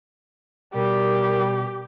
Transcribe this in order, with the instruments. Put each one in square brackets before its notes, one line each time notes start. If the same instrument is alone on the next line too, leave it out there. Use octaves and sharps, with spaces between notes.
[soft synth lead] B2 [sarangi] G3 [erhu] G4 [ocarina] A#4